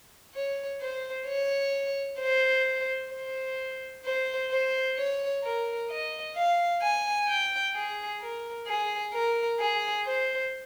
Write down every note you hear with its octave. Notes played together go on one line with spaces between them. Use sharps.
C#5
C5
C#5
C5
C5
C5
C5
C#5
A#4
D#5
F5
G#5
G5
G#4
A#4
G#4
A#4
G#4
C5